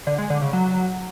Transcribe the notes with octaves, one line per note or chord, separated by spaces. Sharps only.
D3
G#3
D3
C#3
F#3